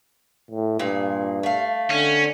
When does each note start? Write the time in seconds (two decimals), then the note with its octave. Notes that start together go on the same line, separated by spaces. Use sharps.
0.51 A2
0.79 G2 A#2 G#4
1.43 A3 F5
1.91 D3 C#4